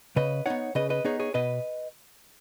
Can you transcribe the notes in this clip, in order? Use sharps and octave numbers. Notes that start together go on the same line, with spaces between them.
C#3 B4 D#5
B3 D#4 C#5 F#5
C#3 B4 D#5
B4 D#5
B3 D#4 G#4 C#5
G#4 C#5
B2 B4 D#5